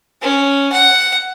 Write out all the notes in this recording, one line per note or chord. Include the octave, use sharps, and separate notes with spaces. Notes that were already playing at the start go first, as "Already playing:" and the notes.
C#4
F#5